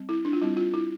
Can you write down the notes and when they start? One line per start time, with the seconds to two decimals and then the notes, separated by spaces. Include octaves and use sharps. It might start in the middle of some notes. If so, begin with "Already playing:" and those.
Already playing: G3 C4
0.09 E4
0.25 D4
0.33 F4
0.41 G3 C4 E4
0.57 F4
0.74 E4